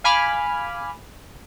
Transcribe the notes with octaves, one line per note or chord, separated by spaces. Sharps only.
F5 G#5 B5 D6 F6